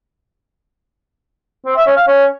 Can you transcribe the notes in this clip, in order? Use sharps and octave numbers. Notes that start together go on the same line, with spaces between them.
C4
E5
C#4
F5
C#4